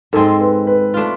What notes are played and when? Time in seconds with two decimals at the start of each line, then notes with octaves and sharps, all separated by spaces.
0.13 G#2 G#3 C4 A4
0.41 B4
0.67 B4
0.94 A3 D4 F4